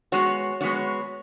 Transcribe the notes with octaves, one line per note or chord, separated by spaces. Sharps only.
G#3 B3 F#4 C#5
G#3 B3 F#4 C#5